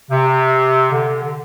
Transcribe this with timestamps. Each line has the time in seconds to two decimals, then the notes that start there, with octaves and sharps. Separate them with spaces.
0.10 C3
0.91 D3
1.22 D3